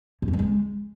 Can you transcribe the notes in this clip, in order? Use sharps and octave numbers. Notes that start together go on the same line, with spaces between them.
F#2
F2
E3
G#3